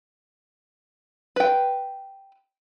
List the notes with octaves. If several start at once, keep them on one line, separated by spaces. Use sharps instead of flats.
B4 G5